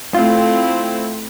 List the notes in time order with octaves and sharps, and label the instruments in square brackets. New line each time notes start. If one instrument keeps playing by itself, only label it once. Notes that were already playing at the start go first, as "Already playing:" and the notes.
[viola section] A3 C4 E4 [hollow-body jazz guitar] F4